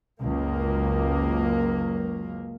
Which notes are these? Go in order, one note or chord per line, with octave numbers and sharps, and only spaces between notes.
F#1 C#2 A#3